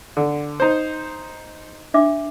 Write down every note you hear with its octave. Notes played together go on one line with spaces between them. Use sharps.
D3
D#4 C5
D4 E5 D6